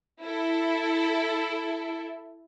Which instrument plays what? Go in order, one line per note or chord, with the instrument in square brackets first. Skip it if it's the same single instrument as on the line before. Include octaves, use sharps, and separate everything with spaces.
[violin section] E4 A4